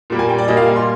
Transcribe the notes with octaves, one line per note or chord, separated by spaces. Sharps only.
A#2 G3 A#3
G#5
G5
D5
A#2 G3 A#3 D#5
F5
G#5
C6